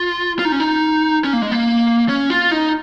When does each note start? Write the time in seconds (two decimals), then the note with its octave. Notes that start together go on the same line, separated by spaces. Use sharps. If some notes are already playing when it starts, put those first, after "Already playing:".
Already playing: F4
0.39 F4
0.45 D#4
0.52 C#4
0.60 D#4
1.24 C#4
1.33 A#3
1.42 G#3
1.52 A#3
2.09 C#4
2.30 F4
2.51 D#4